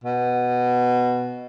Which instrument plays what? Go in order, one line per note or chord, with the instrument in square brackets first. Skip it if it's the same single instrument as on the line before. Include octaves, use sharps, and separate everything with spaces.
[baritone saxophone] B2